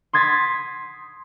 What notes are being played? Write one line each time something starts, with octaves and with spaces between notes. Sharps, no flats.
C6 D#6 G#6 A6 B6